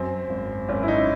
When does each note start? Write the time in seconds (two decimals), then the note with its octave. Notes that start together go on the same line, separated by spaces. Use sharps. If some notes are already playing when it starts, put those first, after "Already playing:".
Already playing: F#2 C4
0.30 G#1
0.69 G#1 C#4
0.83 E4
0.88 D#4